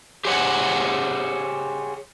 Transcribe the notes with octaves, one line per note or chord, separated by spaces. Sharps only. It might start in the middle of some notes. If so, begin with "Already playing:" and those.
G4 G#4 C5 C#5 F#5